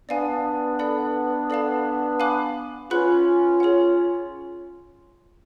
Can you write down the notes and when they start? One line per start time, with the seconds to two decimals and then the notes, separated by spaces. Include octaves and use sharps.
0.09 B3 D4 D5 F5 G#5
0.79 A4 D5 F#5 B5
1.50 A4 D5 F5 A5
2.20 F5 G#5 B5 D6 F#6
2.90 C#4 F4 G#4 B4 F#5 B5 F#6
3.60 G#4 C#5 F#5